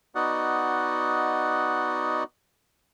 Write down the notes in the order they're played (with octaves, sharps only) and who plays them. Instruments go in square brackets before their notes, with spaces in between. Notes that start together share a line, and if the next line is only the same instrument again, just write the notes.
[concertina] B3 D#4 F#4 D5 D#5 F#5